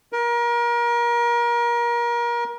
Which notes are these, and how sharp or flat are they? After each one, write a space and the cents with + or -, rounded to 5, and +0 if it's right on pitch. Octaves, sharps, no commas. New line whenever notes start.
A#4 +30